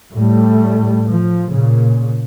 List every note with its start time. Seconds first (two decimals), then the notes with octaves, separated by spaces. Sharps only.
0.12 A2 G3 A3
1.08 F3
1.52 A#2 C#3